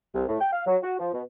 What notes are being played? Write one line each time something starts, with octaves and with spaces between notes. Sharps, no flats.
C2
A2
G5
F5
F#3
F#4
F3
B2